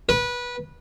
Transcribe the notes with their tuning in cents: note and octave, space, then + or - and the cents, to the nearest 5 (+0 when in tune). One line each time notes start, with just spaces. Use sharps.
B4 -20